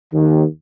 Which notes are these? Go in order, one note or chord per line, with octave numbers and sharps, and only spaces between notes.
D#2